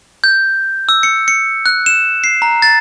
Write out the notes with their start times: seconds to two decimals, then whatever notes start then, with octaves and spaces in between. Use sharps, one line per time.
0.24 G6
0.89 E6
1.03 C#7
1.28 C#7
1.66 F#6
1.86 E7
2.24 C7
2.42 A#5
2.62 A6